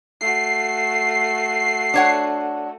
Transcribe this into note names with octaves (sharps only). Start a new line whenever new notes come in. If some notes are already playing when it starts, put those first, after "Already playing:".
A3 F#4 C7
D4 C#5 F#5